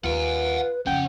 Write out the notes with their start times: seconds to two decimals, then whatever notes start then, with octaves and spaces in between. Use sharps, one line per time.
0.04 D#2 F4 B4 F#5 G#5
0.87 F2 C#3 C#4 F#5 G5